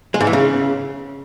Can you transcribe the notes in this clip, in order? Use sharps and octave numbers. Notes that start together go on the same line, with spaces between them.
G#3
G#2
E3
C#3